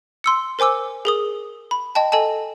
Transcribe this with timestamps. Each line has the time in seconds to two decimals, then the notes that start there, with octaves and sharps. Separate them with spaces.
0.24 C6 E6 C#7
0.59 A#4 C5 G#5 D6 E6
1.05 G#4 A#4 D#6
1.71 B5
1.95 D#5 G5 A5
2.12 A4 D#5 G#5 A5